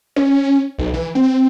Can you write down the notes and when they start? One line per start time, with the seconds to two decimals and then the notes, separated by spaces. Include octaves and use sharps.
0.16 C#4
0.78 B1
0.94 E3
1.15 C4